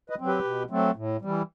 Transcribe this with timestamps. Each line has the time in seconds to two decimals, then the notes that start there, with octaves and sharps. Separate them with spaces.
0.10 B4 D#5
0.19 F#3 C4
0.27 G4 B4
0.44 B2
0.70 F#3 A3 C4
0.96 A2
1.21 E3 G3